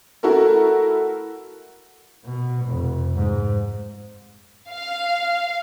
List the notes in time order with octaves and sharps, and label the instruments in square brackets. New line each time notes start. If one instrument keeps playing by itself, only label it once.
[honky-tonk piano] A3 E4 F#4 A4 A#4
[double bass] B2
F1
G#2
[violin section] F5